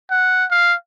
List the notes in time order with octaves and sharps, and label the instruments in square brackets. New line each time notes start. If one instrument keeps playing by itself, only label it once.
[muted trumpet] F#5
F5